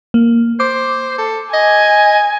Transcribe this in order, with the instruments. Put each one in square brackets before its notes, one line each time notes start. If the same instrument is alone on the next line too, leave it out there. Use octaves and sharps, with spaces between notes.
[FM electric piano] A#3
[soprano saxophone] C5 [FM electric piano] D6
[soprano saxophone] A4
[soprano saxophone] D#5 [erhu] G#5